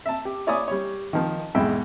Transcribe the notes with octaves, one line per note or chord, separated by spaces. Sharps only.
E5 A5
G4
E4 C#5 D5 G#5 B5 D#6
G3 C#5
D#3 F3
B1 E2 G#2 E4 E5 G5